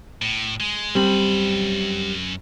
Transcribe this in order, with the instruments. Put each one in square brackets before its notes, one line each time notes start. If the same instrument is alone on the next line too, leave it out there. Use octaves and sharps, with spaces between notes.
[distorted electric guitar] A2
G#3
[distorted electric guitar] F#2 B5 [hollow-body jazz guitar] G3 C4